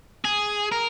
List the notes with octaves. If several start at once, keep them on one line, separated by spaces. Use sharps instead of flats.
G#4
A#4